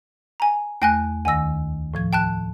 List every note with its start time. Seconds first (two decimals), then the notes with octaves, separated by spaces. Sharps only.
0.40 G#5 A#5
0.82 E2 A3 G5 G#5 F#6 A#6
1.25 D2 D#3 G#5 E6 A#6
1.94 A2 F3 G#6
2.13 G5 A5 F#6